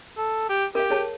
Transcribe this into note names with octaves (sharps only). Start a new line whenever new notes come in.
A4
G4
G4 A#4 F5
G#4 C#5 A5